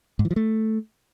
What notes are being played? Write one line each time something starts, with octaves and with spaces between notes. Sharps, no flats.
G#2
E3
F3
A3